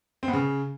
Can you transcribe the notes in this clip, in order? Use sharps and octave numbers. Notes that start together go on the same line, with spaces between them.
C4
B3
C#3